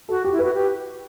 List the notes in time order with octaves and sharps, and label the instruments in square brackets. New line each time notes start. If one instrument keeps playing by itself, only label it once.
[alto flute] F#4 [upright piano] A4
[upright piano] G4
[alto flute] E4
[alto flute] F#4 [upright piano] B4
[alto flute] G4